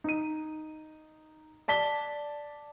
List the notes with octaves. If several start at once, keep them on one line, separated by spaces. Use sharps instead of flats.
D#4 D#7
D5 A5 B6 G7